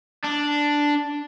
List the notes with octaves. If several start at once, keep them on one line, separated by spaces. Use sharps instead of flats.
D4